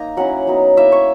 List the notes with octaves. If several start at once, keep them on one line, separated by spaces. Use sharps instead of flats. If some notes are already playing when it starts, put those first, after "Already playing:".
Already playing: A#3 D#4 A#5
F#3 C#4 E4 F#5
F#3 B3 D#4
A#3 E4 E5
C#5